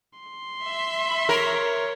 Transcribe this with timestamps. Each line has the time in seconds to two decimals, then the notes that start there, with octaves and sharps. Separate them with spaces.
0.19 C6
0.65 E5
1.29 A#4 C#5